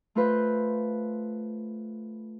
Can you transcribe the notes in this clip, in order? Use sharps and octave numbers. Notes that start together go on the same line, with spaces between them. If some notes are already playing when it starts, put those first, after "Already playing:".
A3 F4 B4 C5